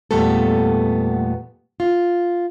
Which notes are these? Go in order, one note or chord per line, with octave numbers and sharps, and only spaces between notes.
E2 A#2 G3 A3 B3 A4
F4